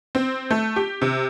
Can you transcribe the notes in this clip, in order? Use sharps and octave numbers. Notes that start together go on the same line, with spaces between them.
C4
A3
G4
C3